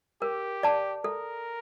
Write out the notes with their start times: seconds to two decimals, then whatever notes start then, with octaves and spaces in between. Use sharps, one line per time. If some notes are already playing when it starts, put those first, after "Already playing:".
0.22 G4 A#4
0.63 D5 A5
1.04 A4 A#4